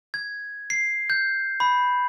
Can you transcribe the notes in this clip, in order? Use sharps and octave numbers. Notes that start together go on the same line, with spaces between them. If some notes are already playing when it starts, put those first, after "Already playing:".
G#6
C7
G6
B5